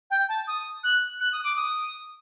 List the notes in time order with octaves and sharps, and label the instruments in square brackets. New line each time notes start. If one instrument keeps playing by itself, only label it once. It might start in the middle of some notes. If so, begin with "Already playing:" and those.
[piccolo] G5
A5
D#6
F#6
F#6
D#6
D6
D#6